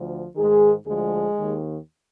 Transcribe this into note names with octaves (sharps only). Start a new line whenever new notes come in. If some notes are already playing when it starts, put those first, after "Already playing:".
Already playing: D2 D3 F3
G#2 D#3 G#3 G#4
D2 D3 F3 G#3 G#4
D#2 D#3